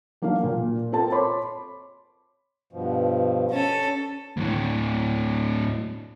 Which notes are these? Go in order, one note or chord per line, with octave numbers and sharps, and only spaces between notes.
F#3 A#3 D4 F#4 F5
A#2
C4 F4 A4 A#4 A5
C#5 B5 C6 D6
G2 B2 F3
C#4 A4
D2 A2